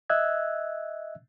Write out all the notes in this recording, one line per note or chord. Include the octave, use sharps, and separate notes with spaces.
D#5 E5 E6 F#6 G#6